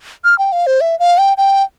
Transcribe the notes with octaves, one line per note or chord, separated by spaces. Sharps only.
F6
G5
F5
C5
E5
F5
G5
G5